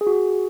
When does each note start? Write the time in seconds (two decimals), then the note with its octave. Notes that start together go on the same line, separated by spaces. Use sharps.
0.01 G#4
0.07 F#4
0.12 G#4